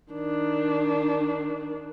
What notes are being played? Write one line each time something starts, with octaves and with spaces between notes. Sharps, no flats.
D#3 D4